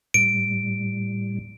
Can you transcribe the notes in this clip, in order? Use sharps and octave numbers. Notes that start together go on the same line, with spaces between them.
A2 G3 D7